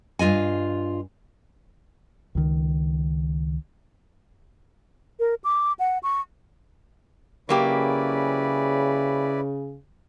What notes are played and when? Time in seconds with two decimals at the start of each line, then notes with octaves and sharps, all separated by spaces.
0.19 G2 F4 D#5 G#5
2.35 C#2 D#3
5.20 A#4
5.44 D6
5.79 F#5
6.03 C#6
7.49 C#3 F#3 A#3 E4 G4 B4 D5